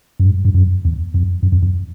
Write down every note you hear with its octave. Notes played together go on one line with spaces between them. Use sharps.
F#2
G2
G2
F#2
E2
F2
F#2
F2
F2